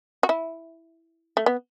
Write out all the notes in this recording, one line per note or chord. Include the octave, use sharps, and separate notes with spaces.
F#4
E4
A3
B3